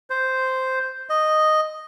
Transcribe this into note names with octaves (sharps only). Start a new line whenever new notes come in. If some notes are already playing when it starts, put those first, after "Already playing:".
C5
D#5